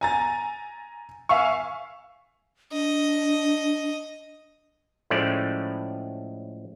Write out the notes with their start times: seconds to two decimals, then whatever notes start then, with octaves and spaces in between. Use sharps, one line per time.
0.01 G#5 A#5 A6
1.29 E5 F5 G#5 C#6
2.72 D4 D#5
5.10 A2 F3 G#3 A3 C#4 D5